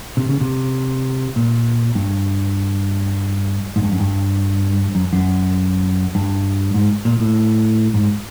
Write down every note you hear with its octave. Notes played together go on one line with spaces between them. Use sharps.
C3
C#3
C3
A#2
G2
G#2
G2
F#2
G2
F#2
F#2
G2
G#2
A#2
A2
G#2